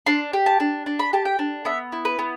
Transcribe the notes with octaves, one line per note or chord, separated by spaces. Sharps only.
D4 C6
G4
A5
D4
D4
B5
G4 A5
G5
D4
B3 E5
E4
B4
B3